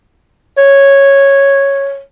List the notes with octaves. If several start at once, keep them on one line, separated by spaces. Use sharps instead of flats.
C#5